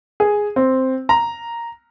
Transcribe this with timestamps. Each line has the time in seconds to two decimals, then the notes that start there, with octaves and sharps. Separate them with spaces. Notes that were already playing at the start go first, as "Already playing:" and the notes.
0.20 G#4
0.56 C4
1.09 A#5